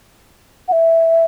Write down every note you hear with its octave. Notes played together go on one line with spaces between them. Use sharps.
F#5
E5